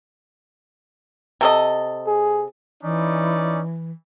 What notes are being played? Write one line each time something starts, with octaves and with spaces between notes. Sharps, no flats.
C3 A4 D#5
G#4
E3 C#4 D#4 D5